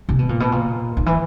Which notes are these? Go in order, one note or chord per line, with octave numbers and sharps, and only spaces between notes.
C3
B2
A#2
B2
A#2
D#3
E3